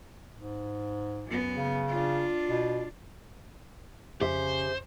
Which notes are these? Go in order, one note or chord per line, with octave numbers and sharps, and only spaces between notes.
G#2
F#2 B3
C#3
D4 F4
B2
F2 C#3 G4 C5 E5